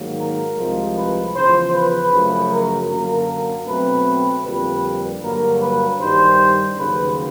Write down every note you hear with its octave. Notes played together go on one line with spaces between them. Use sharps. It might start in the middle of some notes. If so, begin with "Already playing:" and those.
Already playing: G#2 D#3 F#3 A#3
A#4
C2 C3 F3 G#3
B4
E2 C#3 F3 C5
B4
F#2 C#3 F3 A3
A#4
F#2 D3 F#3 A#3 A#4
B2 F#3 A3 C4 B4
F2 D3 G3 A#3 B4
G2 D3 F#3 A#3 A#4
B4
G2 D#3 G3 C5
D#2 C#3 F#3 B4